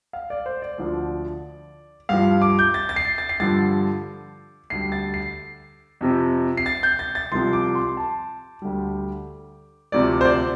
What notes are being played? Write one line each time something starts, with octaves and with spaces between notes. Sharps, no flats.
F5
D5
C5
D5
D2 D3 F3
G2 F3 F5
D6
G6
A6
A6
C7
A6
C7
G2 D3 F3 A6
D2 D3 G3 C7
A6
C7
F2 C3 F3
C7
A6
G6
A6
A6
C2 C3 F3 C6
D6
C6
A5
D2 D3 G3
D2 C3 F3 D5
C5
D5